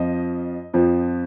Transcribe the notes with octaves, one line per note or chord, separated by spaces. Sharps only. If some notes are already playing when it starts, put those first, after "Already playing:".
Already playing: F2 F3 D#5
F2 F3